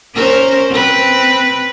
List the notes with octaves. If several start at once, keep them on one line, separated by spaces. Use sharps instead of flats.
C#4 A#4 C5
C4 B4